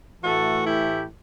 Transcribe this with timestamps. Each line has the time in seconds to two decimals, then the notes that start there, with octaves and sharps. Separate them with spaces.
0.22 A2 E3 A3 F#4 A4
0.64 E4 G4